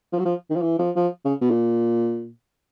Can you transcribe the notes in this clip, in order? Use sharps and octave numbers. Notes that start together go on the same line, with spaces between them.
F3
F#3
F3
D#3
F3
E3
F3
F3
C#3
B2
A#2